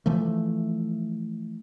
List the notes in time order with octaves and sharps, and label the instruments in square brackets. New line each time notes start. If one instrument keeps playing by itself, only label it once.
[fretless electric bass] E3 F3 A3